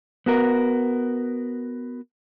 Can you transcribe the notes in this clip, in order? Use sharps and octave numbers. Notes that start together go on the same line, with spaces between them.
B3 F#4 A#4